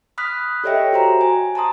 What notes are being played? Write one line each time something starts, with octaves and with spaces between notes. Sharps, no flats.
B5 D#6 F6 F#6 B6
G4 A4 C#5 D#5 E5 G5
F#4 C5 A#5
G#5
A5 A#5 C6 D#6